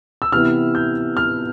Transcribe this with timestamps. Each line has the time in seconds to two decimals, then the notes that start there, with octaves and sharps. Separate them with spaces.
0.22 E6
0.32 C3 E3 B3 E4 F6
0.75 G6
1.17 F6